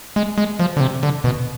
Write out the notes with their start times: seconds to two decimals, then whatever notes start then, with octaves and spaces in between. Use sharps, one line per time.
0.16 G#3
0.38 G#3
0.60 F3
0.77 D3
0.80 C3
1.03 D3
1.24 B2